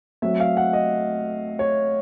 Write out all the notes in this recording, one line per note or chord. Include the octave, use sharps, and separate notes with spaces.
F#3 A3 C4 E5
F5
F#5
D#5
C#5